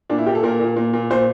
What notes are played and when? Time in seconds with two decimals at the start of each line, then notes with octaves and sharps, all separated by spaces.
0.10 A#2 D4
0.18 E4
0.26 A#2 G4
0.35 A4
0.43 A#2 A#4
0.60 A#2
0.76 A#2
0.93 A#2
1.10 A#2 C5